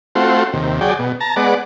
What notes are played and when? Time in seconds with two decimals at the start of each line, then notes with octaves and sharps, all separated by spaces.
0.15 A3 C4 F4 F#4
0.53 D#2 C3
0.81 F#3 G#4 D5 G5
0.99 B2
1.20 A5 A#5
1.36 G#3 B3 D5 F#5